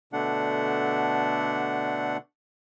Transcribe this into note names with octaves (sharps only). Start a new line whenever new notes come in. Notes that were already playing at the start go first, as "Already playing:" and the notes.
B2 D3 A3 D4 F#5